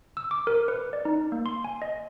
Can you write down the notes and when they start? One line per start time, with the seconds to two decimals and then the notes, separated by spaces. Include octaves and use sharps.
0.17 E6
0.31 D6
0.47 A#4
0.68 B4
0.93 D5
1.05 D#4
1.32 A#3
1.46 C6
1.64 G#5
1.82 D#5